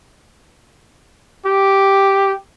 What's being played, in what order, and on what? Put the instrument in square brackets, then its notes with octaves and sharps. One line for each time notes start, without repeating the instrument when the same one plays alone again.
[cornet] G4